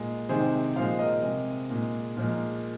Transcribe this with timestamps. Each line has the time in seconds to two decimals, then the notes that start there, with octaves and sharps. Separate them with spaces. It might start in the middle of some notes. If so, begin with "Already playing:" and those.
Already playing: A#2 G#3
0.29 C3 D#3 G#3 G#4 C5
0.76 A#2 F3 G#3 C5 F5
0.99 A#4 D#5
1.23 C3 G#3
1.70 A#2 G#3
2.17 A#2 F3 G#3 A#4